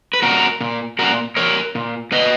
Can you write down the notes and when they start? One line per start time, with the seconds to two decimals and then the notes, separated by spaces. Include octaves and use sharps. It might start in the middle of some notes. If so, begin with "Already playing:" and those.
0.13 B4
0.22 A#2 F#4 A#4
0.61 A#2
0.99 A#2 F#4 A#4
1.36 A#2 A#4 C#5
1.75 A#2
2.12 A#2 B4 D#5